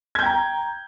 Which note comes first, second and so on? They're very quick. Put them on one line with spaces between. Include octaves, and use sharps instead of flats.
G#6 G6 G5 A#5